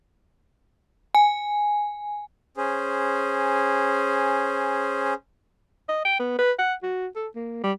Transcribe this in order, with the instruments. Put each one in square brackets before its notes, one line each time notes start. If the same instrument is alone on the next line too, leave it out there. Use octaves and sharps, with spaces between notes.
[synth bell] G#5
[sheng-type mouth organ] C#4 G#4 C5
[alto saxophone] D#5
G5
B3
B4
F#5
F#4
A4
A#3
G3